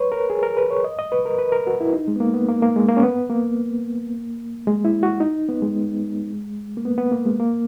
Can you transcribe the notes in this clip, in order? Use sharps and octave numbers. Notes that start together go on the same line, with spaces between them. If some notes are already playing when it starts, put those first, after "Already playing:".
Already playing: B4 C#5
A#4
G#4
A#4
B4
C#5
D#5
D#5
B4
A#4
B4
A#4
F#4
E4
D#4
G#3
B3
A#3
B3
A#3
A#3
G#3
A#3
C#4
B3
A#3
G#3
E4
F#4
D#4
B3
G#3
A#3
B3
B3
A#3
G#3
A#3